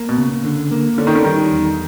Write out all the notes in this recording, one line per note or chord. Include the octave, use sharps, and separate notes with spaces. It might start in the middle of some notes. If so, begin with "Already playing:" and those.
Already playing: A#3
B2
C#3
D3
A#3
D3 C#4
D#3
D3
D#3 G3
E2